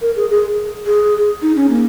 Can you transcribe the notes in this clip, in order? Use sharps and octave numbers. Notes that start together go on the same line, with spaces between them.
A#4
G#4
G#4
G#4
D#4
C#4
A#3